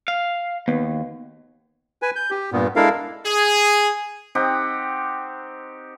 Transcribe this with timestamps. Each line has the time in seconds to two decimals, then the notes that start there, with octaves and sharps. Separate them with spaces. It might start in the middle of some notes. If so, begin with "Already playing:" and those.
0.08 F5
0.68 D#2 B3
2.02 B4 G#5
2.16 G6
2.31 G4
2.52 G2 A#2 B3
2.76 G#3 D4 E4 A4 A#4 F5
3.25 G#4
4.35 C4 D#4 G4 F#5